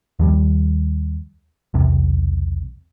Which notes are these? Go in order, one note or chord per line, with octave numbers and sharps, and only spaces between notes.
D#2 F3 G3
B1 E2 C3